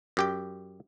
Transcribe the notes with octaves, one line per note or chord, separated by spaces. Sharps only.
F#2 G4 G5